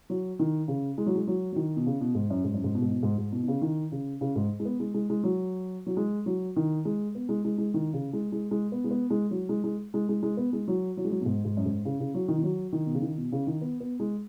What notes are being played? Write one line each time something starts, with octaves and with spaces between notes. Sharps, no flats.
F#3
D#3
C#3
G#3
F#3
G#3
F#3
F#3
D#3
B2
C#3
B2
G#2
F#2
G#2
F#2
G#2
B2
G#2
B2
G#2
G#2
B2
B2
C#3
D#3
C#3
C#3
G#2
G#3
B3
G#3
G#3
G#3
F#3
F#3
G#3
F#3
D#3
G#3
B3
G#3
G#3
G#3
D#3
C#3
G#3
G#3
G#3
B3
G#3
B3
G#3
F#3
G#3
G#3
G#3
G#3
G#3
B3
G#3
F#3
F#3
G#3
F#3
B2
G#2
G#2
F#2
G#2
C#3
C#3
F#3
D#3
D#3
F#3
D#3
B2
C#3
D#3
B2
C#3
D#3
B3
B3
G#3